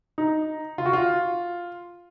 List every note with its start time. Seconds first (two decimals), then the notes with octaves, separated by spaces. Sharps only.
0.18 D#4
0.78 F4
0.86 F#4
0.93 F4